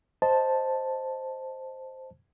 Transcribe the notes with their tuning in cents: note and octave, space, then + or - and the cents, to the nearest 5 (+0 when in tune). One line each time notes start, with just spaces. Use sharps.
C5 +0 D#5 +0 A5 +0